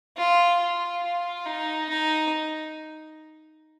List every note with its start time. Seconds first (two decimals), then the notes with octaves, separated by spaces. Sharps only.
0.17 F4
0.60 F4
1.04 F4
1.46 D#4
1.90 D#4